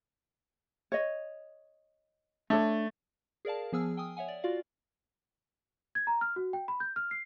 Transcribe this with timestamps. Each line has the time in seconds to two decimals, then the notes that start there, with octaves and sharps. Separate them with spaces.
0.92 C#5 D#5
2.50 A3 D4 C#5
3.45 G#4 A#4 D5 F5 A5
3.72 F3 B3 G#4 G#5 E6 F6
3.97 G5 G#5 D#6
4.17 C#5 E5 F#5 G#5
4.28 D5
4.44 F4 F#4 D5 F5
5.95 G#6
6.07 A#5
6.21 F6
6.36 F#4
6.53 G5
6.68 B5
6.80 G6
6.96 F6
7.11 C7